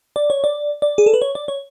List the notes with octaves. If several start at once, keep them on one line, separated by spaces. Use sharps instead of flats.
D5
C#5
D5
D5
G#4
A4
B4
C#5
D5
C#5